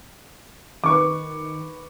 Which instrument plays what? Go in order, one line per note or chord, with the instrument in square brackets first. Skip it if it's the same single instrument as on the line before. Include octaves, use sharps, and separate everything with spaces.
[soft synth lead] D#3 [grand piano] B4 C#6 D6